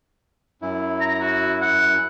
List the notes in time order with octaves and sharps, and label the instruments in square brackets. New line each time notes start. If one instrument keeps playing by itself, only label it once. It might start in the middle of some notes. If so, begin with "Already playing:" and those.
[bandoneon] F#2 E4
[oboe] A#5
F#4
F#5